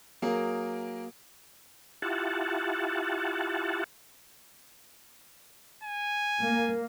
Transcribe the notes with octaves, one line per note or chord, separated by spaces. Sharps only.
F#3 A#3 G#4 A#4
E4 F4 G4 F#5 A5
G#5
A#3